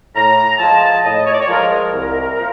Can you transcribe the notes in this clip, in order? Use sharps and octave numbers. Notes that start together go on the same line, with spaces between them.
A2 A#5
F3 G#3 A5
A2 D#5
C#5
D5
C#5
F3 G#3 A#4
A#4
C2
A#2 F3